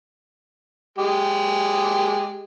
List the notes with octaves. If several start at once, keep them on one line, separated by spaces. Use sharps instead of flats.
G#3 G4